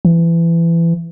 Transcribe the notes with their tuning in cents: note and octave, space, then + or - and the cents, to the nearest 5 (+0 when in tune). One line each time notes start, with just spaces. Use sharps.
E3 +25